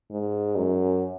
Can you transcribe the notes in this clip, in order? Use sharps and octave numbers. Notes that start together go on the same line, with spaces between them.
G#2
F#2